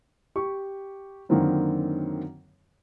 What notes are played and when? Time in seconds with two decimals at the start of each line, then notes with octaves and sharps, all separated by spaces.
0.36 G4 C#6
1.29 F#2 D3 D#3 A#3 C4 E4